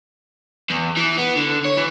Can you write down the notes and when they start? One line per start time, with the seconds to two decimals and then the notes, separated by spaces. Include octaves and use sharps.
0.70 E2
0.97 E3
1.18 B3
1.36 D3
1.65 C#5
1.77 E3